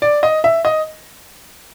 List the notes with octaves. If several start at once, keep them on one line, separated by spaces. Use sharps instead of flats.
D5
D#5
E5
D#5